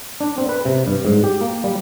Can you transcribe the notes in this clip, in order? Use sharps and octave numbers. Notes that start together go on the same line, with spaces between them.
D4
C4
B4
C3
G2
G#2
G4
A#3
G3